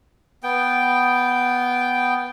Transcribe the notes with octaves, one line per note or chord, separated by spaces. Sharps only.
B3 G5